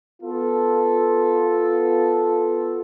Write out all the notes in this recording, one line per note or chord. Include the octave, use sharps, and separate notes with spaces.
B3 F4 A4